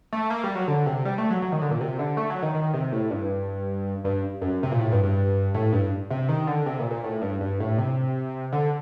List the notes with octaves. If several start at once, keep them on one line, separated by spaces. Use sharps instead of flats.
A3
A#3
G3
F#3
D3
C3
G3
A3
F#3
F#3
D#3
D3
A#2
C3
D3
A3
F#3
D#3
D#3
C3
A2
G2
G2
F#2
C3
A#2
A2
G2
G2
A2
G2
C3
D#3
D3
C3
A#2
A#2
A2
G2
G2
A2
C3
D3